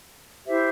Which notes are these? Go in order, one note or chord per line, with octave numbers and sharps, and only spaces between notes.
E4 G4 C5 E5